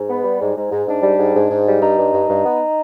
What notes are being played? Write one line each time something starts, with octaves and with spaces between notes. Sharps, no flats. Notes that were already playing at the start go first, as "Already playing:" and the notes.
Already playing: G#2
B3
G3
G#2
G#2
G#2
G#2 D4
G3
G#2
G#2
G#2
G3
G2 D#4
G2
G2
G2
B3